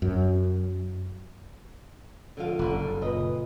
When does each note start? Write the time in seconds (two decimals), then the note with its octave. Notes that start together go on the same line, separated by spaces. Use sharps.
0.02 F#2
2.37 D3 F3 F5
2.59 F#1 D3 F#5
2.86 G3
3.01 A#2 B4 D#5